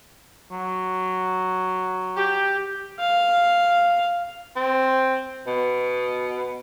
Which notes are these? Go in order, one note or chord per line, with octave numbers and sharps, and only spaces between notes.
F#3
G4
F5
C4
B2